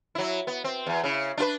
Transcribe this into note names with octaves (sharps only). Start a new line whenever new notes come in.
F#3 E4
B3
C4
E2
C#3 E4
D4 F4 B4